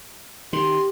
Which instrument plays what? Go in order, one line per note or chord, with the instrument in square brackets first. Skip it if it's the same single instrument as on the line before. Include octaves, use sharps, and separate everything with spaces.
[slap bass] D#3 [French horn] G4 [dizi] C6